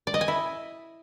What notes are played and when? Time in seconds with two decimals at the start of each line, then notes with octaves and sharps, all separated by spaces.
0.07 D5
0.14 D#5
0.21 G#5
0.28 E4